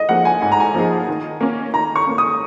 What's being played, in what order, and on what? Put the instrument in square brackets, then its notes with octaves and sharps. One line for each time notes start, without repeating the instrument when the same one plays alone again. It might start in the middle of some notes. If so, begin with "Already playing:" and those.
Already playing: [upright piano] D#5
[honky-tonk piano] F3 A#3 D#4 G#4 [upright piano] F#5
[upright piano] G#5
[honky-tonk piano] G#2 [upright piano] G#5
[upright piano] A#5
G#5
[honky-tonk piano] F3 A#3 D#4 G#4
D#3
A#3 C#4
[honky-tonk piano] D#3 [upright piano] A#5
[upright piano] C#6
[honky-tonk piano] A#3 C#4
[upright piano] D#6